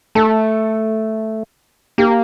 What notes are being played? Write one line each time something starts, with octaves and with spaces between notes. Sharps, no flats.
A3 A4
A#3 G4